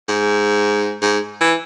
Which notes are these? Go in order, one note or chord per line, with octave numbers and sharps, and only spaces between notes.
G#2
G#2
E3